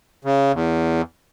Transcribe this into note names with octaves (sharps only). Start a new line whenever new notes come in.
C#3
E2